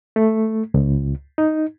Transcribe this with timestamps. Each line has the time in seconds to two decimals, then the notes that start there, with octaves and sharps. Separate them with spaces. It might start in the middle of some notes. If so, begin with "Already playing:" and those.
0.16 A3
0.74 C#2
1.38 D#4